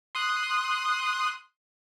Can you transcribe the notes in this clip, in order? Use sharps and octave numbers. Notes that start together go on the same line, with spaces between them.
C6 D#6 F#6